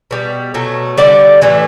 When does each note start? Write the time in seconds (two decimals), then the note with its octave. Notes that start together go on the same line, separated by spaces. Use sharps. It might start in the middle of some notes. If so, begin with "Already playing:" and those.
0.11 B2 G3
0.54 B2 F#3 A3
0.97 D3 G3 D5
1.41 A2 E3 A3